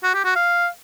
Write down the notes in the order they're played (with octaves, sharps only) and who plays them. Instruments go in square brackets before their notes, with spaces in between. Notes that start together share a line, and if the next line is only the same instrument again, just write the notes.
[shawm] F#4
G4
F#4
F5